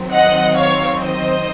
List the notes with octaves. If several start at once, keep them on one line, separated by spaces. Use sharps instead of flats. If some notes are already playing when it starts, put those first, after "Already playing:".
Already playing: D#3 F#3 C4
D#5 F#5
C#5 F5
C5 D#5